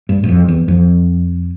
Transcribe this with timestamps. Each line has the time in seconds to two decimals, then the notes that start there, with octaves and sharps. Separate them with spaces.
0.09 G2
0.23 G2
0.28 F2
0.48 E2
0.68 F2